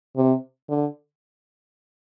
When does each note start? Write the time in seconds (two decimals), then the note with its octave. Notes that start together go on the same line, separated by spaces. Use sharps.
0.16 C3
0.69 D3